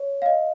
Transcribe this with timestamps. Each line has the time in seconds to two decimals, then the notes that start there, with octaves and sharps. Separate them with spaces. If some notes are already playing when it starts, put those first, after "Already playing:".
Already playing: C#5
0.22 F5
0.26 D#5